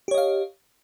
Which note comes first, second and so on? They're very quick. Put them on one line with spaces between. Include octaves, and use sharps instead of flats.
G4 C#5 D#5 F5